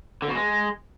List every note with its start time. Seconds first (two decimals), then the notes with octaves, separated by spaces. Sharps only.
0.22 D3
0.29 B2
0.35 G#3